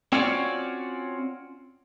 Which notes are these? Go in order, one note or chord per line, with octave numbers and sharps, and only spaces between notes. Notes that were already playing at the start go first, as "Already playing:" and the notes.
C4 C#4 F4 F#4 C#5 D5